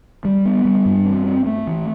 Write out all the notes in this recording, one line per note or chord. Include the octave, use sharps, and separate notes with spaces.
G3
B3
G3
G2
C4
C4
A3
E3